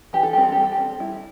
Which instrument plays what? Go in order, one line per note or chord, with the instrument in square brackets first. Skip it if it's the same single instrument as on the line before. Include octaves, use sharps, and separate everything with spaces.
[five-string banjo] E3 G4
A4
G3 C4 G4
A4
G3 G4
A4
G4
C4
G3 E4